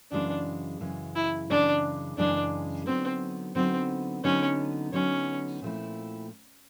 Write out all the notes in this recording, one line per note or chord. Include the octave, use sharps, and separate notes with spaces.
F#2 C#3 E3 G#3 D4
F#2 C#3 E3 G#3
E4
F#2 C#3 E3 G#3 D4
F#2 C#3 E3 G#3 D4
D3 F#3 B3 C4 D#4
D3 F#3 B3 C4 D#4
D3 F#3 B3 C#4 D#4
D3 F#3 B3 C#4 D#4
A#2 F3 A3 C4 E4